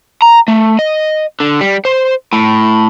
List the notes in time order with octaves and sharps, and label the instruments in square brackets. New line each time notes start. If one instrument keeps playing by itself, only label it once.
[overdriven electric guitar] A#5
A3
D#5
D3
G3
C5
A2